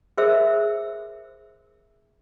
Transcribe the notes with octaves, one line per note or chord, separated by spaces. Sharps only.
G#4 A#4 C5 E5 E6